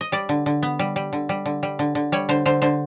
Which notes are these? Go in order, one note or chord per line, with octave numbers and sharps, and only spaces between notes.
D#5
G3 D5
D3
D3
B3
G3
G3
D3
G3
D3
G3
D3
D3
G3 C#5
D3 C5
D3 C5
D3 C5